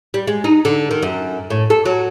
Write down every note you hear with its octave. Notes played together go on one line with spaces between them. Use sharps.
G3
G#3
D#4
D3
D#3
F#2
A2
A4
F#3